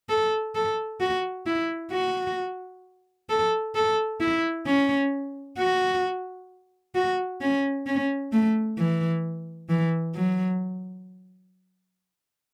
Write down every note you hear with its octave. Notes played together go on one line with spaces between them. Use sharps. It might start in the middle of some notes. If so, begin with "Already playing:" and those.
A4
A4
F#4
E4
F#4
A4
A4
E4
C#4
F#4
F#4
C#4
C#4
A3
E3
E3
F#3